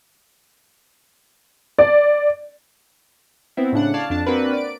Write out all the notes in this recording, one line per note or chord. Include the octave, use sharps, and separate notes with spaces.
D5
B3 C4 E4
A2 C#3 D4 F#5
C#5 D5 F5 A5
F2 D4 A5
A#3 C4 D4 F#4 A#4 B4
D5 D7